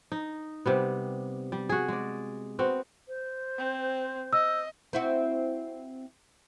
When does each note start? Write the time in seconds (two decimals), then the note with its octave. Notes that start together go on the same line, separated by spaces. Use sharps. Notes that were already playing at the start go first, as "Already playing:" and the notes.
0.12 D#4
0.66 C3 G3 B3
1.52 G3
1.69 F#4 G#4
1.88 G#3 D5
2.59 B3 C4 F#4
3.08 C5
3.58 C4
4.33 D#5 E6
4.93 C4 E4 F#4